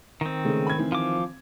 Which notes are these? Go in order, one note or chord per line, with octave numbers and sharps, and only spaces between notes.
D#3 C4
C#3 G#3 A3
B5 G#6
D#3 E3 C4
F3 D6